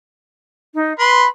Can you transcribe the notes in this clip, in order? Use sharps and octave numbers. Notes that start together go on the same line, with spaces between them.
D#4
B4 B5 C6